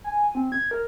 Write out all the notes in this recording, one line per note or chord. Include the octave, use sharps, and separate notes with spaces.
G#5
C4
G#6
A#4